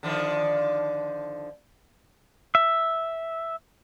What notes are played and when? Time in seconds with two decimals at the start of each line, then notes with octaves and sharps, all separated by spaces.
0.03 D3 D#3 F3
2.55 E5